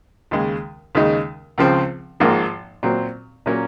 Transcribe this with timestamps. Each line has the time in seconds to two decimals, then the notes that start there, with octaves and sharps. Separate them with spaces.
0.31 D#2 C#3 G#3
0.95 D#2 C#3 G#3 D#4
1.58 C#2 C#3 F3 C4
2.20 G#1 G#2 F3 A#3
2.83 A#2 F#3 C4
3.46 A#2 F#3 A#3 C#4